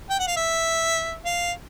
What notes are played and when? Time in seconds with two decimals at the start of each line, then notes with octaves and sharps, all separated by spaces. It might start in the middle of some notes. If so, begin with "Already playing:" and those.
0.10 G5
0.20 F#5
0.27 F5
0.37 E5
1.25 F5